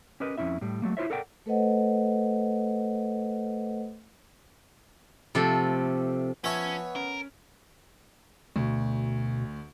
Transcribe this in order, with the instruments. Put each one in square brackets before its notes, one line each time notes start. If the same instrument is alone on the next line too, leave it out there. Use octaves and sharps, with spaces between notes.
[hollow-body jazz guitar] C#4 G4 A#4 B4 D#5
F2 C3 C#4 E4 E5
A2 G3
F#3 A3 A#3
E4 F4 C5 C#5 E5
A4 A#4 D5 F#5 G5
[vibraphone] A3 A4 B4 C5 D#5 F#5
[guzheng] C3 F3 A3 A4
[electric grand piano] F3 A5 [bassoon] B3 [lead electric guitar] C#4 [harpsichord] C#5 E5 G#5
[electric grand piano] C#4 [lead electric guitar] A#4
[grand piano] D2 [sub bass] B2